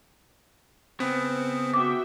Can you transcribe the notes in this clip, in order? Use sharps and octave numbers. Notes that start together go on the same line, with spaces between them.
C#3 B3 C4
F#4 E5 G5 D6